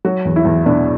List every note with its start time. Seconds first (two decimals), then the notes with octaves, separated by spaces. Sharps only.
0.05 F#3 F#4
0.25 E2
0.36 E4
0.45 E2
0.66 B2 D4